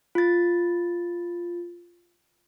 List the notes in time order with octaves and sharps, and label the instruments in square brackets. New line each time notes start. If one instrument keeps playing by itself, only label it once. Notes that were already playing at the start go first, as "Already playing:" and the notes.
[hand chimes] F4 A6